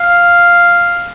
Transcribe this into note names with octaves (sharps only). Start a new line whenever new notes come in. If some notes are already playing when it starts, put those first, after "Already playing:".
Already playing: F5